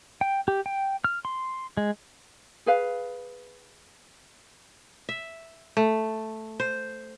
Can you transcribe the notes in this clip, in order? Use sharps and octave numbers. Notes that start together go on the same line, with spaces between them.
G5
G4
G5
F6
C6
G#3
G#4 B4 F5
E5
A3
C5